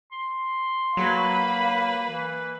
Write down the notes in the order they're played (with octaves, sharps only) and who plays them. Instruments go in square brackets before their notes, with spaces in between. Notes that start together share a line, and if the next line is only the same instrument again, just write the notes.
[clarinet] C6
[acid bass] F#3 [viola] A#3 B4 [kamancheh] F5 B5
[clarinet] E3